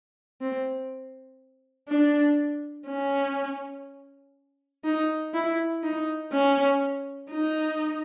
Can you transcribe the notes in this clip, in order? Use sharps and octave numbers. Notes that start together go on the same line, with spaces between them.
C4
D4
C#4
D#4
E4
D#4
C#4
D#4